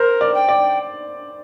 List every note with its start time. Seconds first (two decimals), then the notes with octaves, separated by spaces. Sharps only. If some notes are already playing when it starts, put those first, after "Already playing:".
Already playing: A#4 C5
0.21 D5
0.34 G5
0.49 D5